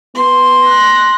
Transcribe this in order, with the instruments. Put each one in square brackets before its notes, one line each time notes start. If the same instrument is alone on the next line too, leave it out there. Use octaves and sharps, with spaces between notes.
[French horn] B3 [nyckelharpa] C6
[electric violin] F#6 A#6